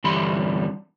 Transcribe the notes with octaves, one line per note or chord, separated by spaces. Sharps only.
G2 D3 E3 G3 B5 C6